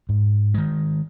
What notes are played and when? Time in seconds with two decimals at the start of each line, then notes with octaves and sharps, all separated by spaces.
0.09 G#2
0.54 D#3 G#3